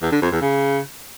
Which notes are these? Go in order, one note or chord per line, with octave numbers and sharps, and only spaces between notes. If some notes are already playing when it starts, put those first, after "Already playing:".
E2
D3
F2
E2
C#3